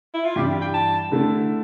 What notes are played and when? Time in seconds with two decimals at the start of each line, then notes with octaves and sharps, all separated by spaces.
0.14 E4
0.25 F4
0.36 G2 E3 G3 G4
0.61 G5
0.74 A5
1.12 D3 A3 E4